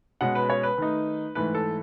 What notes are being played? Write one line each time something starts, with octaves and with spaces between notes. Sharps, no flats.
B2 G#3 C#4 F#5
B4
C#5
B4
D#3 A3 D#4
G#2 E3 A3 B4
A4